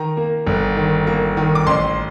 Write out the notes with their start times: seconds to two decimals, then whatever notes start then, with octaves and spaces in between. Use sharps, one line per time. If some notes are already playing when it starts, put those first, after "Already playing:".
Already playing: D#3 A#5
0.17 A#3
0.47 G1
0.77 D#3
1.07 A#3
1.37 D#3
1.55 D6
1.67 A1 C6